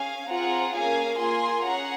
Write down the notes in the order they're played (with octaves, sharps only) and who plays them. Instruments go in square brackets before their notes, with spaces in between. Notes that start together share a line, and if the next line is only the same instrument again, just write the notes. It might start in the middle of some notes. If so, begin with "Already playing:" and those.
Already playing: [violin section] C#4 G#4 F5 G#5
C4 F4 G#4 F#5 A#5
A#3 C#4 G#4 F5 G#5
A#3 F4 G#4 G#5 C6
C#4 G#4 F#5 A#5